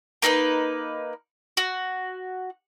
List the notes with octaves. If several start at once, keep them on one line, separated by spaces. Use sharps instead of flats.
A#3 D#4 A4 B4
F#4